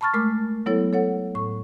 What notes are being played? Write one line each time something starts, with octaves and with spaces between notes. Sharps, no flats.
A5 B5 C#6 F6 A6
G#3 A3 A#4 D6 F6
F#3 B3 E4 A4 C#5
A4 C#5 F#5
A2 C#6